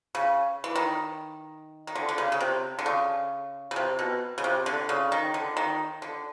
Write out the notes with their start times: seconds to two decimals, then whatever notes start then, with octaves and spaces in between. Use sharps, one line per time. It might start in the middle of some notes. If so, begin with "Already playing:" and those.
0.15 C#3
0.64 E3
0.76 D#3
1.87 D#3
1.95 D3
2.09 D3
2.18 C#3
2.32 C#3
2.40 C3
2.79 D3
2.86 C#3
3.71 C#3
3.76 C3
3.99 B2
4.38 C#3
4.44 C3
4.66 D3
4.89 C#3
5.12 D#3
5.34 D3
5.57 D#3
6.02 D3